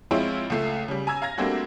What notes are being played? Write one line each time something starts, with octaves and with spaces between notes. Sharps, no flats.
F3 G#3 C4 E4 F4 C#5
C#2 A3 C7
C#3 G3
G#5 A#5 E6 G#6
F5 A#5 G#6 A#6
G3 A3 A#3 C4 D4 F#4